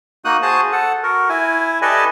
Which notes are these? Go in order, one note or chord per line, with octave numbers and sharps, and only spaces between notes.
A#3 D#4 F#4 D#6 F#6
F#4 G#4 C5 A5 D#6
A4 F#5
F#4 A#4
E4 G#5
G4 A4 B4 D5 D#5 G#5